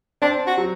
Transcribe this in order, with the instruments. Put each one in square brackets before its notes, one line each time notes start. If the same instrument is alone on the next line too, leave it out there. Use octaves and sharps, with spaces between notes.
[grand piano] C4 [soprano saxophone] D4
[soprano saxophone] F#4
[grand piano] F#3